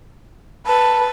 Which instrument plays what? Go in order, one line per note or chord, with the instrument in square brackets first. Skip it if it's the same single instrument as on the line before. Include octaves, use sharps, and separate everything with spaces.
[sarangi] B4 [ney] A5